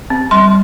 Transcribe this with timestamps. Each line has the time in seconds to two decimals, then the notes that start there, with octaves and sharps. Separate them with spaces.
0.10 C4
0.31 G3 C6